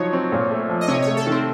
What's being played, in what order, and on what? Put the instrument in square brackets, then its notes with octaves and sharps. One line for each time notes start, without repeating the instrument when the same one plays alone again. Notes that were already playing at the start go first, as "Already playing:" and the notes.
Already playing: [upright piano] F3 F#3 D#4 [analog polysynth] C#5
[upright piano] C4
A#2
A3
F3
[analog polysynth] D#5
[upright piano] C3 [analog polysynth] C#5
[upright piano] A3 [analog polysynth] C#5
[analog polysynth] A4
[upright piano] D#3
[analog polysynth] C4